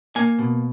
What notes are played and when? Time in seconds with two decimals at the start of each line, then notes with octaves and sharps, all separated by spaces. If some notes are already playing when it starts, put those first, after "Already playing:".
0.16 A#3 G#5
0.39 B2